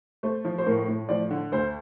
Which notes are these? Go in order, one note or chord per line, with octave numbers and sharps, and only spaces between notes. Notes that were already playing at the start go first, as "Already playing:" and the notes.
A3 C5
F3
C5
A2 A#4
A2
F3 D5
D3
D2 C5